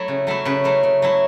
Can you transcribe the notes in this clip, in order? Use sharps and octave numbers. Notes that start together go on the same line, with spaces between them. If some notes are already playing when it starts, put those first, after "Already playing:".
Already playing: F#3 A3 E4 A4
C#3
F#3 A3 E4
C#3 B4
F#3 A3 E4
C#3
F#3 A3 E4